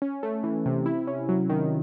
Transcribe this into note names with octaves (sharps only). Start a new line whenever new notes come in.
C#4
A3
E3
C3
E4
C#4
F#3
D#3